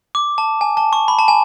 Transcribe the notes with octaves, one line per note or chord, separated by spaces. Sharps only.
D6
A5
G#5
A5
C#6
B5
A5
G#5